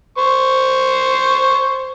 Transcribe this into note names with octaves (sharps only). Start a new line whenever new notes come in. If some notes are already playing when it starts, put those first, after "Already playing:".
C5 C#6